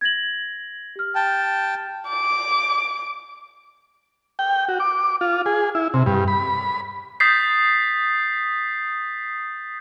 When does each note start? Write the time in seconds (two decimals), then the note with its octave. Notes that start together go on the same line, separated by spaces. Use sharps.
0.01 G#6 A#6 F#7
0.96 G4 F6
1.15 G5 A5
2.09 D6
4.39 G5
4.68 F#4
4.80 D6
5.21 F4
5.46 G#4
5.75 E4
5.94 C3
6.06 G2
6.28 B5
7.20 D#6 G6 A6 B6 C7